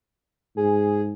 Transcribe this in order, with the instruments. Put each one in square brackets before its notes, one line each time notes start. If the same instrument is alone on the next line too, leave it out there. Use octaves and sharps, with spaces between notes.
[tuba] G#2 [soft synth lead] G#4